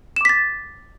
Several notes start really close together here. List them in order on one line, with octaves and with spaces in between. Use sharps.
E7 D6 B6 A6